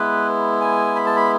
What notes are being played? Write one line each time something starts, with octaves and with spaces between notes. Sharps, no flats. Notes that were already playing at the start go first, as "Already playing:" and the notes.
Already playing: G#3 B3 E4 B4
G#5
B5
A5
B5